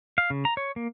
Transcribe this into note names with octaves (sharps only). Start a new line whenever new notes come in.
F5
C#3
A#5
C#5
A#3